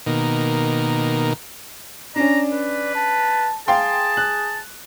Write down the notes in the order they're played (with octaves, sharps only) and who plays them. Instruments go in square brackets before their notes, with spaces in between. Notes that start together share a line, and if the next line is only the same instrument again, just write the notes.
[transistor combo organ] B2 D#3 A#3
[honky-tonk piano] C#4 D4 [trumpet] D5 [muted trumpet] A#5
[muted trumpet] B4
[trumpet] A5
[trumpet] G#4 [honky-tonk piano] F5 G5 C6 [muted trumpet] A5
[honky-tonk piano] F#6